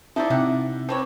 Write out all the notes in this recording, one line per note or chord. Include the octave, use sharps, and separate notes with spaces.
D#4 E4 A4 C5 D5
C3 D4 G4 F#5
C4 D4 B4 C#5